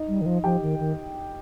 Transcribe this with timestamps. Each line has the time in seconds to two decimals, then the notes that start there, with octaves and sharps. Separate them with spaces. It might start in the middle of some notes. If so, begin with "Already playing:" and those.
Already playing: D#4 D#5
0.08 G3
0.21 D#3
0.26 F3
0.44 F3 G4 G5
0.62 D#3
0.80 D#3